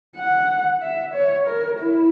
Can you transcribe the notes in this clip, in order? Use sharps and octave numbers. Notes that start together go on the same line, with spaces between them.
F#5
E5
C#5
A#4
E4